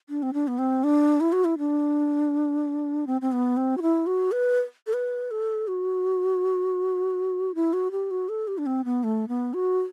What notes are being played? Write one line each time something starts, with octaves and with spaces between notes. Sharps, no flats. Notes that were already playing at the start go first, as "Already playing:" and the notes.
D4
C4
D4
B3
C4
D4
E4
F#4
E4
D4
C4
C4
B3
C4
F#4
E4
F#4
B4
A4
B4
A4
F#4
E4
F#4
G4
F#4
A4
G4
D4
C4
B3
A3
B3
F#4